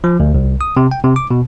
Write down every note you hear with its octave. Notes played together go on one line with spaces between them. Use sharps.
F3
D2
C2
D#6
C3
G5
C3
D6
B2